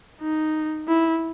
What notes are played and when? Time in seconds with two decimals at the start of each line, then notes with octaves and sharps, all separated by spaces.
0.21 D#4
0.88 E4